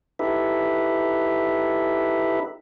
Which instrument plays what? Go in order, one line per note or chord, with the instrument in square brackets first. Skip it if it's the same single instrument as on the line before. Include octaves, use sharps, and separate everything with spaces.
[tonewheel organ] D#4 E4 G4 A4 B4 E5